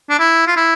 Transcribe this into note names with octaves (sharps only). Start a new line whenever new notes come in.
D4
E4
F4
E4